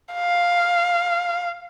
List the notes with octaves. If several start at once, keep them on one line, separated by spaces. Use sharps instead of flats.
F5